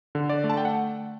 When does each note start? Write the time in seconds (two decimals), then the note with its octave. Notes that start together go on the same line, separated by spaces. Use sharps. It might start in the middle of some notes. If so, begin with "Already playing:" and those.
0.15 D3
0.30 D5
0.44 A3
0.50 A5
0.57 G5
0.65 F#5